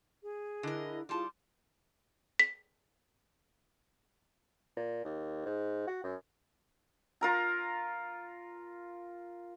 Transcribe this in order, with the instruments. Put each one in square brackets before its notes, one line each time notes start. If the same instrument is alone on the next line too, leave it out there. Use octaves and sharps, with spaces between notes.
[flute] G#4
[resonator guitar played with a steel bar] D3 A#4 [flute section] E4 [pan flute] D#5
[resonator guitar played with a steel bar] G3 A5 [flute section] E4 F4 G#4 [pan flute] C6
[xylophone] B6
[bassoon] A#2
D#2
G#2
F#4
F#2
[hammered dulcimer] F4 A#4 A#5